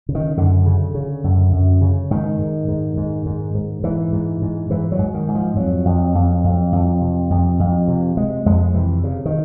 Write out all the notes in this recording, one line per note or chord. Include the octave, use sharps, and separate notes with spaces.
C#3
D#3
F#2 D3
C#3
C#3
F#2
F#2
C#3
G#2 D#3
G#2
G#2
G#2
G#2
G#2
G#2 E3
G#2
G#2
G#2 E3
F#3
G#2
D#3
G#2
F3
F2 F#3
F2
F2
F2
F2
C3
F2
F2
C3
C3 G#3
F2 G#3
C3 E3
C#3
D#3